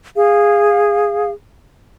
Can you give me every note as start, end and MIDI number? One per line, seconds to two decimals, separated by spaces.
0.16 1.30 68
0.16 1.30 77